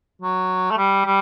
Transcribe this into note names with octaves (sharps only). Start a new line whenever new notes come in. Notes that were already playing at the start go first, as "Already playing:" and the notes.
F#3
A3
G3
G3